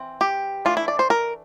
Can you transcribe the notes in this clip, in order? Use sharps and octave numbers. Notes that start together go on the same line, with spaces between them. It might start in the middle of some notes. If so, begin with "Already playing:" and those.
Already playing: E3 C4
G4
E3 A3 D4 F4
E4
D5
C5
A#4